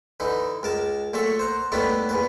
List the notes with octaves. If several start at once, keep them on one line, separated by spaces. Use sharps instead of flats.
D3 E3 D#4
C#2 A#4 A5
A#2 F#3 A3 A4 C#6
C5 F#5 A#5
D#2 A2 G3 A3 B3 D4
E2 A#2 B4